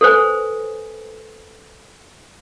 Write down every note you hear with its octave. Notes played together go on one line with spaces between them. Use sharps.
A4 B4 C5 G#5